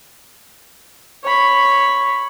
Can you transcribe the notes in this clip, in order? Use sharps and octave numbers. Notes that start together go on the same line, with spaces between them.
C#5 B5